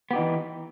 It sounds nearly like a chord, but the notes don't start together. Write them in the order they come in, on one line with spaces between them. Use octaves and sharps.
B3 G4 D#4 E3